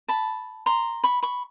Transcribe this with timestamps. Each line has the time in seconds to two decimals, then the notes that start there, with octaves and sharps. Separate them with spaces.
0.08 A5 B5
0.66 A#5 C6
1.04 B5 C#6
1.23 B5 C#6